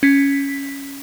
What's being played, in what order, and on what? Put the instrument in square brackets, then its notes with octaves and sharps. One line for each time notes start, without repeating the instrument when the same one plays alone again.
[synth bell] C#4 B6